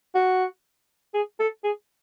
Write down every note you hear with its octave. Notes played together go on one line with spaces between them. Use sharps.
F#4
G#4
A4
G#4